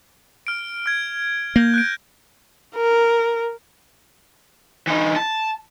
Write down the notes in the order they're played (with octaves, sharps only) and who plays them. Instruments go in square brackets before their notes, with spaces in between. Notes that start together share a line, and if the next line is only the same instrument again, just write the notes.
[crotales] F6 D7
F6 G#6
[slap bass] A#3 [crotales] G6 A#6
[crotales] F#6 G6 D7
[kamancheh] A#4
[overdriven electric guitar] E3 D#4
A5